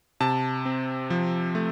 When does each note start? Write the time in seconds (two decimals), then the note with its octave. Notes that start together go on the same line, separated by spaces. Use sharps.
0.20 C3 A5
0.65 C4
1.10 F3
1.55 A3